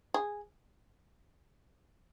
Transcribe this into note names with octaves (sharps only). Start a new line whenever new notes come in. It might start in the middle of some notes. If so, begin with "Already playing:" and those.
G#4